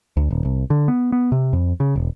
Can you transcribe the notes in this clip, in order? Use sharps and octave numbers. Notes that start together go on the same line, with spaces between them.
D2
D#1
C2
D3
B3
B3
C3
F2
C#3
E1